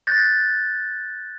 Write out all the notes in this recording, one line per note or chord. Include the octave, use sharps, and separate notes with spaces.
F#6 G6 A6 A#6